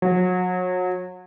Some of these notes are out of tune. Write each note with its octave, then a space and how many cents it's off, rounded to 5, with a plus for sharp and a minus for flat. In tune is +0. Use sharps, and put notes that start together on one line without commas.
F#3 -30